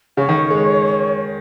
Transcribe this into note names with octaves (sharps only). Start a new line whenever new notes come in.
C#3 C#5
D#3
G#3